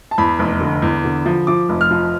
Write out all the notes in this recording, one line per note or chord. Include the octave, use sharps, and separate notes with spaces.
A5
E2 B5
F1
D3
E2
D3
F3
F3 D6
F1
F6
F3